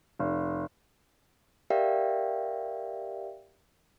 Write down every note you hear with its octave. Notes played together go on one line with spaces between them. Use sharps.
F1
G4 A#4 D5 E5 F5 G5